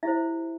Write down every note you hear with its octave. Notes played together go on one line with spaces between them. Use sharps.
E4 G4 C5 E5